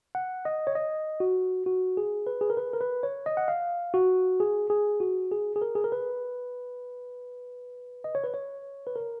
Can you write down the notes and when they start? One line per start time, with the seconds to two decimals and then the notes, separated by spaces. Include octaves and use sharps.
0.15 F#5
0.45 D#5
0.67 C#5
0.75 D#5
1.20 F#4
1.66 F#4
1.97 G#4
2.27 B4
2.41 G#4
2.50 A#4
2.57 B4
2.73 A#4
2.81 B4
3.03 C#5
3.26 D#5
3.37 F#5
3.48 F5
3.94 F#4
4.40 G#4
4.70 G#4
5.00 F#4
5.31 G#4
5.56 G#4
5.62 A#4
5.75 G#4
5.84 A#4
5.92 B4
8.04 D#5
8.15 C#5
8.24 B4
8.34 C#5
8.87 B4
8.96 A#4